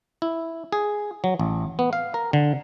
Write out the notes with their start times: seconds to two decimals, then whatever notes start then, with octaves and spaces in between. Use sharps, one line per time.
0.22 E4
0.72 G#4
1.24 F#3
1.39 A1
1.79 B3
1.93 F5
2.14 A#4
2.33 D3